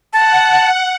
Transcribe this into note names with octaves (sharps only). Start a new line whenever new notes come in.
F#5 A5